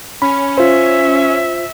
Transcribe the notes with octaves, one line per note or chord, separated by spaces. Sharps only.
C#4 B5
F4 C5 E5